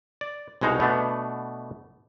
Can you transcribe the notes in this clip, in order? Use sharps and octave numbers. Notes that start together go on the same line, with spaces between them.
D5
C2 B2 G#3 D#4 F#4 F5
B2 A3 B3 D4